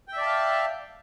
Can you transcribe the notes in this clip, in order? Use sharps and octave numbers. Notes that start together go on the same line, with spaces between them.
D5 E5 F5 G5 A5